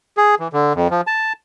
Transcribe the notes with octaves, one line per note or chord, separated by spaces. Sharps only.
G#4
E3
D3
F2
F3
A5